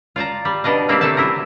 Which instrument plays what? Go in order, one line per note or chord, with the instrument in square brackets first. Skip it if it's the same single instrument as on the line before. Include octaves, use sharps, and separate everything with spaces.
[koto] F4 D5 A5 A#5
G3
B2 D4 D#5 F5
G3 A#3 C4 D4 E4 G4
C3 A3 C5 E5 A5
F#3 E4 F4 A#4